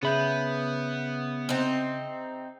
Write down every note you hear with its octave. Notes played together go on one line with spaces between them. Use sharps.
C#3 B3 G#4 E5 B5 G6
C4 D#4